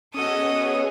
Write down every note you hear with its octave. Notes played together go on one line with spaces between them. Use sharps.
B3 C#4 F#4 G#4 A4 C#5 D#5 D#6